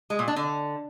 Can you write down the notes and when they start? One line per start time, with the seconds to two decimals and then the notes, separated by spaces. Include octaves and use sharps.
0.10 G#3
0.19 A#2
0.28 D4
0.36 D3